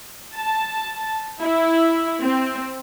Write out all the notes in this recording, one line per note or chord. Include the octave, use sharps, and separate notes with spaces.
A5
E4
C4